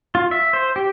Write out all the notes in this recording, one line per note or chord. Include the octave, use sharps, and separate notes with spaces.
F4
E5
C5
G4